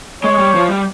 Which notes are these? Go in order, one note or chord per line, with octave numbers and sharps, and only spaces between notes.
G#3 C#5
G3
F3
G3